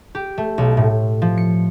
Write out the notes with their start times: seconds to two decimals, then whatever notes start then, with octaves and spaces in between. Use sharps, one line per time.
0.15 G4
0.38 A3
0.58 B1
0.77 A2
1.22 F3
1.37 C#7